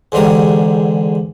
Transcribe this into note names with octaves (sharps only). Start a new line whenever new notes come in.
E2 G#2 D3 G4 A#5